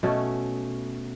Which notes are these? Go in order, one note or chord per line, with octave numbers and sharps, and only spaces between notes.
B2 A3 C#4